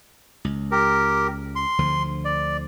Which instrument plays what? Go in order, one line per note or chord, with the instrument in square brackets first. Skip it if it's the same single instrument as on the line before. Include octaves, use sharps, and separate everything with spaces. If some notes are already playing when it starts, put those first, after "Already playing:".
[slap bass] C#2
[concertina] G4 A#4
C6
[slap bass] D2 D3 F3
[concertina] D5